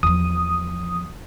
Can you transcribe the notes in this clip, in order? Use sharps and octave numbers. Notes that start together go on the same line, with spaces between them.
E2 F3 D#6